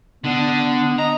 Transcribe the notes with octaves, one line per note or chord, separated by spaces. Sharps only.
D3 B3 D4
D#5 A#5